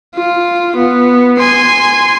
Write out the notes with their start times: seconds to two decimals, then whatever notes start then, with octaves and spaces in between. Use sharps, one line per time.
0.15 F4
0.76 B3
1.38 G#5 C6